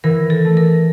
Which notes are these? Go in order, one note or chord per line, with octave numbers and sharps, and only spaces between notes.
E3 A#4
A4
A3
A#4